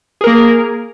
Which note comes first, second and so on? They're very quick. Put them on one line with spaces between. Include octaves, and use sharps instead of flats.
G#4 A#4 A#3